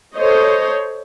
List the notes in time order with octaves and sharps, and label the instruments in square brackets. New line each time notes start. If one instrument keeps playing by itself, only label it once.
[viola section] A4 C5 C#5 D#5